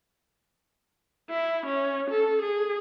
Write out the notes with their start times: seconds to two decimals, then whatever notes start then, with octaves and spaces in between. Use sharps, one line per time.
1.30 E4
1.66 C#4
2.10 A4
2.42 G#4